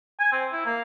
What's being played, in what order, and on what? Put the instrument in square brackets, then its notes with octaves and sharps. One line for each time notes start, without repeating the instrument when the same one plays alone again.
[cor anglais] G#5
C4
E4
A#3